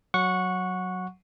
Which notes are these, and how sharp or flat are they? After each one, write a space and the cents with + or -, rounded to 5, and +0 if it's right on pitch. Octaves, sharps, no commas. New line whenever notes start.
F#3 +0 F#5 -15 C#6 +0